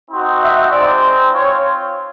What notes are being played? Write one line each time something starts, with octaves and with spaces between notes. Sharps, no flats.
C4 D#4 F#4
E5
G#3 C4 D#4 D5
C4 F4 C#5